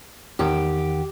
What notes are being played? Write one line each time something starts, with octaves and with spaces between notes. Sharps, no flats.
E2 D#3 G4 F#5